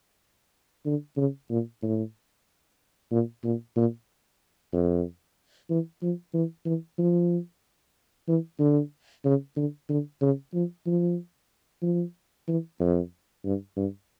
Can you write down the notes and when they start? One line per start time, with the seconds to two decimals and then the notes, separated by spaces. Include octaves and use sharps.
0.86 D3
1.17 C#3
1.50 A#2
1.82 A2
3.11 A#2
3.44 A#2
3.76 A#2
4.73 F2
5.70 E3
6.02 F3
6.34 E3
6.66 E3
6.99 F3
8.28 E3
8.59 D3
9.25 C#3
9.56 D3
9.90 D3
10.21 C#3
10.54 F3
10.87 F3
11.82 F3
12.48 E3
12.80 F2
13.45 G2
13.77 G2